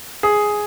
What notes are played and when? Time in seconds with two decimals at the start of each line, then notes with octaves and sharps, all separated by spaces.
0.23 G#4